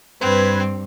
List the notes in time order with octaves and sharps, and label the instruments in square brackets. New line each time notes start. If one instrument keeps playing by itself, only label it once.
[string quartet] G2 [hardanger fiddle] C4 [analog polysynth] B4 G#6